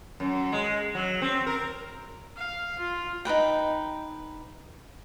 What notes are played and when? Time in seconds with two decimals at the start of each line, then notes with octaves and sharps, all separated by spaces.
0.20 F#2
0.52 G#3
0.95 F#3
1.22 C4
1.46 A#4
2.36 F5
2.79 F4
3.25 D#4 F#4 B4 G5